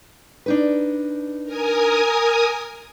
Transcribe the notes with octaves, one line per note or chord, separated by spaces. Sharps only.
D4 D#4 B4
A#4 G#5 D#6